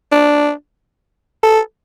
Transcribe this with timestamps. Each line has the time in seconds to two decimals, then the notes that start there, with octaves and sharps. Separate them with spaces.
0.12 D4
1.43 A4